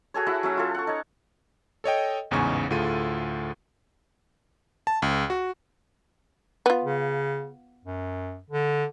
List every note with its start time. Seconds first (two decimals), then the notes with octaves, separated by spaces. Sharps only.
0.14 F#4 G#4 A4 C#5
0.26 E4 F#4 E5 F#5
0.43 F#3 C#4 E5
0.57 F4 A4
0.74 F#5 C#6
0.87 D#4 C#5
1.84 A4 C#5 D#5 G5
2.31 A1 E2 G#2 C#3 G#5 C#6
2.70 D2 A2 F4 G#4 A4 D#7
4.87 A5
5.02 C#2
5.30 F#4
6.66 B3 F4
6.84 C#3
7.84 F#2
8.50 D3